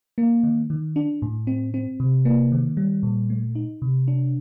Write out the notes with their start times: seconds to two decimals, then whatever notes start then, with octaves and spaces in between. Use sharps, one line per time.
0.18 A#3
0.43 D#3
0.70 D#3
0.96 D4
1.22 A2
1.47 C4
1.74 C4
2.00 C3
2.25 A#3
2.52 D#3
2.77 G3
3.03 A#2
3.30 A3
3.55 D#4
3.82 C3
4.08 D4